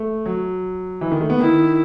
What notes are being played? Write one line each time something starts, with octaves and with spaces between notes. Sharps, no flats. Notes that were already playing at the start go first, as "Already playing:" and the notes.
Already playing: A3
F#3
E3
D#3
A3
B3
D#3 E4